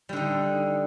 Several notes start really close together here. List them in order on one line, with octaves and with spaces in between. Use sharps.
G3 D3 D#4